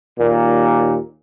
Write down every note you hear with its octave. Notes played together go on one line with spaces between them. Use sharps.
D#2 A#2